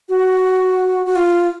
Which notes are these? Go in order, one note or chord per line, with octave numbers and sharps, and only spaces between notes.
F#4
F#4
F4